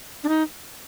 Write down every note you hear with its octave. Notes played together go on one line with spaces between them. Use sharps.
D4
D#4